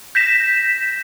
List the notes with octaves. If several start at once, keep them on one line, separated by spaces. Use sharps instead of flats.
G6 A#6 B6 E7